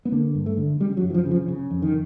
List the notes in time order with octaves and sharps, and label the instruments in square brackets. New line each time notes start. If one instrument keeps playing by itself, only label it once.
[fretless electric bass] B3
D3 A#3
G2
A3
D3
C#3 G3
F#3
F#2
E3
F3
C#3
F3
C#3
F2
D#3